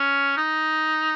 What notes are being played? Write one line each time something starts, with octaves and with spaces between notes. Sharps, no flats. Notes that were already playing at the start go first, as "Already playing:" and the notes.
Already playing: C#4
D#4